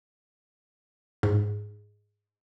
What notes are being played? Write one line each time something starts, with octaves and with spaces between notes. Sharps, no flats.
G#2